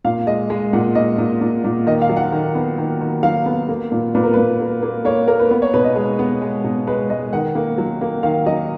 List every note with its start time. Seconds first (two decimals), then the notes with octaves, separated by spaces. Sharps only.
0.05 A#2 F5
0.27 G#3 D#5
0.50 G#3
0.73 A#2 F#5
0.95 A#2 D#5
1.18 A#2
1.41 A#2
1.64 A#2
1.86 D#3 D#5
2.02 F5
2.10 F#3
2.17 F#5
2.32 D#3
2.55 B3
2.78 D#3
3.01 D#3
3.23 F#3 F5
3.46 B3
3.69 A#3
3.92 A#2
4.15 A#2 B4
4.23 A#4
4.33 A#2 B4
4.60 A#3
4.82 A#3
5.05 A#3 C#5
5.28 A#3 A#4
5.40 B4
5.51 B3 B4
5.62 C#5
5.74 B2 B4
5.84 D#5
5.96 G#3
6.19 B3
6.42 G#3
6.64 B2
6.87 G#3 B4
7.10 G#3 D#5
7.33 D#3 F#5
7.55 A#3
7.78 F#3
8.01 A#3
8.23 D#3 F5
8.46 F#3 D#5